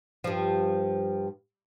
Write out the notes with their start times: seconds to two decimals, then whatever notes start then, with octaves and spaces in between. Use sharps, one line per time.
0.24 G2 F3